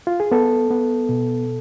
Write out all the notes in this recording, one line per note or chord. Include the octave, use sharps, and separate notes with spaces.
F4
G#4
B3 A4
B3
B2